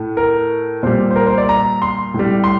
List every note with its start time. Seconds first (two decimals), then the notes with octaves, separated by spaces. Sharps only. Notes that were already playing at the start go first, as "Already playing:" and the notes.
Already playing: A2 A3
0.17 A#4
0.83 A#2 G3 C5
1.11 C5
1.16 A#4
1.27 C5
1.38 D5
1.49 A#5
1.82 C6
2.14 A2 G3
2.44 C6